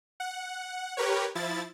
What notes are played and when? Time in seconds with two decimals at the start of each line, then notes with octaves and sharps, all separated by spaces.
0.20 F#5
0.97 G4 A#4 B4 C#5
1.35 F3 E4 A6